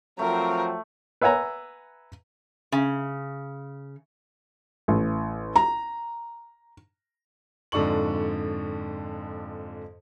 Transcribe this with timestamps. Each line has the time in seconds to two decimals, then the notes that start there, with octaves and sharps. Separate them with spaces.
0.19 F3 F#3 A3 C4 A#4
1.21 B4 E5 F#5 G#5 A#5
2.72 C#3
4.88 A1
5.56 A#5
7.72 F2 G#2 D3 D5 C#6 F#7